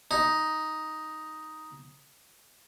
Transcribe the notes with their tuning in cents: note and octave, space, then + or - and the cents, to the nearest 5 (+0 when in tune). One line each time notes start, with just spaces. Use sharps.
D#4 +5